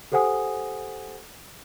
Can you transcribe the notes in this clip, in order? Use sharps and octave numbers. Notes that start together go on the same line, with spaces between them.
G4 A4 C5 F#5 G#5 D#6